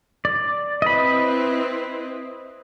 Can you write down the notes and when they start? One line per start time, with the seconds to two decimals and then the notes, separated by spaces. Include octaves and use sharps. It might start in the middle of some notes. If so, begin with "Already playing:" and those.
0.25 D5
0.82 C4 E4 B4 D#5 B5